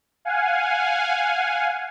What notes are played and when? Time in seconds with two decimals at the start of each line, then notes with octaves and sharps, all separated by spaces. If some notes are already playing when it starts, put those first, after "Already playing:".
0.25 F5 F#5 G#5